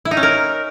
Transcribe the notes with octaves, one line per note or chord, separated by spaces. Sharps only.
E4
D#4
C#4
A#4